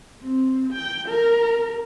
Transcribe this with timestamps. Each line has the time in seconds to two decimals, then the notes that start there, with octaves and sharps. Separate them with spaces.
0.22 C4
0.73 G5
1.08 A#4